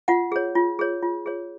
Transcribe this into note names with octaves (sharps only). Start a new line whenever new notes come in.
F4 F#5
G#4 C#5
F4
G#4 C#5
F4
G#4 C#5